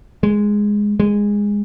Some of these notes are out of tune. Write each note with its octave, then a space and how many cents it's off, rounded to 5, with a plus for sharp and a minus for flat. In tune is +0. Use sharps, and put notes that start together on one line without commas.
G#3 -5
G#3 -15